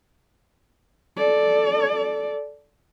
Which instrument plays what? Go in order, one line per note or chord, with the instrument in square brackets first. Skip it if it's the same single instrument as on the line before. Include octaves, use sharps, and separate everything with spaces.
[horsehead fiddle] A4 D5